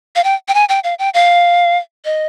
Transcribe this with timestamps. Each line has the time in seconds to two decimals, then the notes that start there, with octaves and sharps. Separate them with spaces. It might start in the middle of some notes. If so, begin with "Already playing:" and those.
0.16 F5
0.24 G5
0.48 G5
0.54 G#5
0.69 G5
0.84 F5
0.99 G5
1.14 F5
2.05 D#5